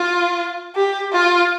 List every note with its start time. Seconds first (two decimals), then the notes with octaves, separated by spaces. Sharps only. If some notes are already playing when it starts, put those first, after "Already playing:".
Already playing: F4
0.75 G4
1.13 F4